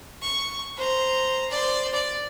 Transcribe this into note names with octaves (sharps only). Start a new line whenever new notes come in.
C#6
C5 A#5
C5 D5
D5